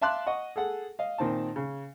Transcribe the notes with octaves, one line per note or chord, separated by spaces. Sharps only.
E5 F5 A5 C6 D6 F#6
D#5 F#5 C#6
G#4 A4 F#5
D#5 F5
A#2 D#3 C4 A5
C#3